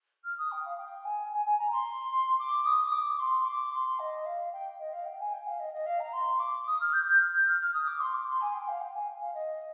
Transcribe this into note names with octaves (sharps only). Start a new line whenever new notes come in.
F6
D#6
G5
F5
G5
G#5
G#5
G#5
A#5
C6
D6
D#6
D6
C6
D6
C6
D#5
F5
G5
D#5
F5
G5
G#5
G5
F5
D#5
D#5
F5
A#5
C6
D6
D#6
F6
G6
G6
F6
G6
F6
F6
D#6
D6
C6
D6
C6
G#5
G5
F5
G5
G#5
F5
D#5